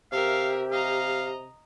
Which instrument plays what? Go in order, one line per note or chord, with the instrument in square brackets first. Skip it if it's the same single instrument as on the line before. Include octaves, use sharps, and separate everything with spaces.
[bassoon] C3 [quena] G4 [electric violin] A#4 E5 [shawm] F5
[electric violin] D#5 A#5 [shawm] F5